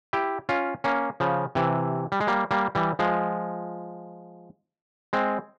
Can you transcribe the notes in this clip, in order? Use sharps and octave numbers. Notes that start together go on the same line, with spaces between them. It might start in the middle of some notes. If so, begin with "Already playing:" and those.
E4 G4
C#4 F4
A#3 C#4
C#3 F3
C3 E3
G3
G#3
G3 A#3
G3 A#3
E3 G3
F3 G#3
G#3 C4